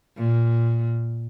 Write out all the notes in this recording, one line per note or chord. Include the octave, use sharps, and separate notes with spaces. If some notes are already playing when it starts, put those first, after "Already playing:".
A#2